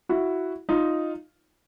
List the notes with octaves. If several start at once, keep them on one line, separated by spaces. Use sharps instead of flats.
E4 F#4
D#4 F4